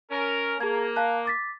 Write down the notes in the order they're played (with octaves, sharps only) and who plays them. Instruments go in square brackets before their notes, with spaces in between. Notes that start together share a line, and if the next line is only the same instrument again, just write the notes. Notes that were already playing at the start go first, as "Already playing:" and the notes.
[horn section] C#4 A#4
[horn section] A#3 [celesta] G#4 A5 G#6
[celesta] F5 A5 F#6
D6 A6 B6